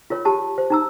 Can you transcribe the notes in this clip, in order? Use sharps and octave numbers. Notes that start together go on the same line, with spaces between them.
F4 A#4 C#5
G4 A5 B5
C5
D#4 A#5 E6